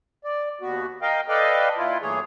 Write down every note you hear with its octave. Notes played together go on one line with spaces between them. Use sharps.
D5
D#2 B3 F#4
A#4 D#5 F5 G5
A4 B4 D5 D#5 F5 G5
A#2 E4 F4
G2 E3 A3 A#3 G#4 C#5